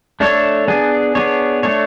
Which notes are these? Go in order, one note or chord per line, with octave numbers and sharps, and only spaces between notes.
A3 D4 A4 C#5
B3 D4 G#4
B3 D4 G#4 C#5
A3 D4 A4 C#5